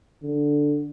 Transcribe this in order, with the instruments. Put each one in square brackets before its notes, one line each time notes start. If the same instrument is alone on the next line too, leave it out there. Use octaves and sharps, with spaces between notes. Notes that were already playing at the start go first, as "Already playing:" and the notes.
[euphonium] D3